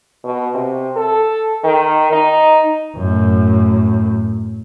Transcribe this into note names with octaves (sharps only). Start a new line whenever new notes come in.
B2
C3
A4
D#3
D#4
F#2 A2